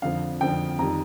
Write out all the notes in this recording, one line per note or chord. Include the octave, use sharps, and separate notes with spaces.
F2 D3 F3 F5
F2 D3 F3 G5
F2 D#3 G3 A#5